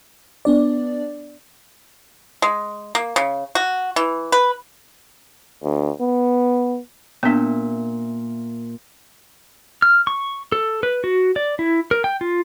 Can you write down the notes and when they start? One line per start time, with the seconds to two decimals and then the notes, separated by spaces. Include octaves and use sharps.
0.45 B3 D4 D5
2.42 G#3
2.95 A#3
3.16 C#3
3.55 F#4
3.96 E3
4.32 B4
5.64 D2
6.00 B3
7.23 A#2 B3 D4 E5
9.82 F6
10.07 C#6
10.52 A4
10.83 B4
11.04 F#4
11.36 D5
11.59 E4
11.91 A#4
12.04 G5
12.21 F4